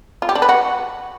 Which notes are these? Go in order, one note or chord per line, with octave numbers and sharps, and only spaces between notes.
F4
G4
D4
B4
F#4